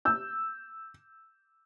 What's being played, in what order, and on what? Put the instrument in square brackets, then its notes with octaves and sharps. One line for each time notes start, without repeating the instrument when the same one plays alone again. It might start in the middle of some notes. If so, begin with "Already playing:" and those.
[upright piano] E6 G6